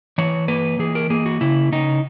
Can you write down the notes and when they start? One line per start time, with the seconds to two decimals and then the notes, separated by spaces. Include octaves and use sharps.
0.18 E3 C#5
0.48 A#3 B4
0.79 E3 G#4
0.95 A#4
1.10 A#3 G#4
1.26 F#4
1.41 C#3 E4
1.72 C#3 D#4